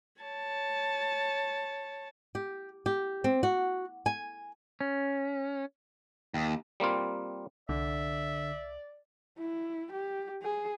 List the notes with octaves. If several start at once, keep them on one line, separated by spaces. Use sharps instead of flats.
C#5 A5
G4
G4
C4
F#4
G#5
C#4
D#2
G3 A#3 C4 F4
C2 D3 D5 E5
E4
G4
G#4